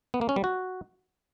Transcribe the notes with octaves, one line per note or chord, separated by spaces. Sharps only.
B3
A#3
C#4
G3
F#4